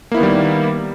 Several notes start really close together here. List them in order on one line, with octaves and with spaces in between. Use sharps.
A#3 E4 B3 D#3 G3